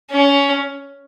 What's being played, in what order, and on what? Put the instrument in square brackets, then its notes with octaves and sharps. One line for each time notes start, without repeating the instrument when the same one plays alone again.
[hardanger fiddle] C#4